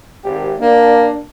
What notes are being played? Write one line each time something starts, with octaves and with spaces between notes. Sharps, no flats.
G#1 G4
A#3 D4